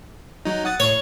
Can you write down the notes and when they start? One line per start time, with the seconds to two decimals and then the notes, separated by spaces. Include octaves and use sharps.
0.45 F#3 D#4
0.65 F#5 D#6 A6
0.80 A2 C#5